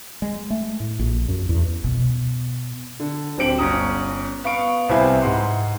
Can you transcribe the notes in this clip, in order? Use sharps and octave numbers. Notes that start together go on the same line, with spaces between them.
G#3
A3
A2
A#1
F#2
E2
B2
D3
D1 D3 C4 G4 D7 F#7
G1 C#4 A#5 D#6
B3 F5 C#6 D7
C2 C3 C4 E4 B4 G#5
G#2 F#5 C6